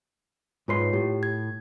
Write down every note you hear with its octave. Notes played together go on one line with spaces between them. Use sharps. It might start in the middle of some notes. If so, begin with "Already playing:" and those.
G#2 F4 B4 C#5 C6 C7
A2 G4
G#6